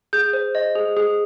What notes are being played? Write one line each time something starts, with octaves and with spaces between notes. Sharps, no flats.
G#4 G6
C5
D#5
G#4
G#4